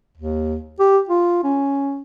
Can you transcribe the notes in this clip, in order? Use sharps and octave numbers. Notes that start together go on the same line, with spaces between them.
D#2
G4
F4
C#4